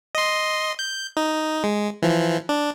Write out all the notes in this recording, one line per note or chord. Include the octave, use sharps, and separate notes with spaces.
D#5 C6
G6
D#4
G#3
E3 F3
D4